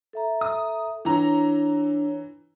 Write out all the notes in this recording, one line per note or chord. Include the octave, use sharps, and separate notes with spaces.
A4 E5 A#5
D#6
E3 D4 E4 C#5 A#5